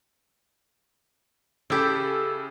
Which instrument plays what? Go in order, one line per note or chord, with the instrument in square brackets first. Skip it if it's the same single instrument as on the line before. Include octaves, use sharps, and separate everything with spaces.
[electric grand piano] C#3 A4 [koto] E4 G4